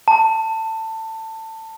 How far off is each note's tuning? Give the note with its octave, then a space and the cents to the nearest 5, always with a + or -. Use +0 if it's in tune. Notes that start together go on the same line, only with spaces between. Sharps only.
A5 +20